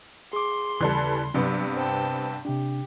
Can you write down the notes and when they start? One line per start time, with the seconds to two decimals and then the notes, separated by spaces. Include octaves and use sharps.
0.33 G#4 C6 D6
0.80 D#2 C#3 E3 G3 A4
1.34 G2 C3 F#3 B3
1.77 C5 G5 A5
2.45 C3 D4 G4